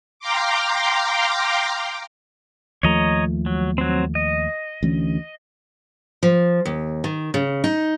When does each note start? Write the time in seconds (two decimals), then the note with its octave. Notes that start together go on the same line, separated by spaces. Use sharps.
0.20 F5 G5 A#5 C6 D6
2.83 D#2 F3 A3 C#5 D#5 A#5
3.46 F#3
3.78 F#3 C4
4.15 D#5
4.83 D2 E3 C#4
6.23 F3
6.65 D#2
7.04 D#3
7.34 C#3
7.64 D#4